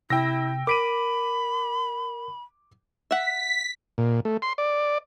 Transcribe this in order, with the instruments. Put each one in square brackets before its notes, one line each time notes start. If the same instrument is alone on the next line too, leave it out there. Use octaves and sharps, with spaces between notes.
[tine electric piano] C3 [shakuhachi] E4 [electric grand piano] G5 E6 A#6
[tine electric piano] A#4 B6 [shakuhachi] B5 [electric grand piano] D6 D7 D#7
[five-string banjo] E5 F#5 [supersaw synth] B6
[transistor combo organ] A#2
A3
C6
D5